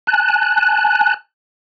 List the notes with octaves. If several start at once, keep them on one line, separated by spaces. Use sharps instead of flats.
G#5 A5 F#6